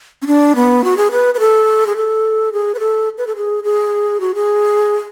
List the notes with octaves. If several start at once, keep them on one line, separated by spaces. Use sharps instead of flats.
C#4
D4
B3
F#4
G#4
B4
B4
A4
G#4
A4
G#4
B4
A4
B4
A4
G#4
G#4
F#4
G#4